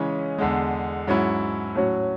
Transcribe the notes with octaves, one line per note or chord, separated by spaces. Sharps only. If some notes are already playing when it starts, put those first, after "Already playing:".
Already playing: C#3 E3 G#3 C#4
E2 D3 G#3
G#2 F#3 C#4 E4
A2 F#3 C#4 F#4